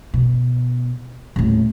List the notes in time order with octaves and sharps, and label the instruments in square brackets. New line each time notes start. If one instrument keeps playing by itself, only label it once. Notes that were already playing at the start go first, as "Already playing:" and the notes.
[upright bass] B2
D#1 A2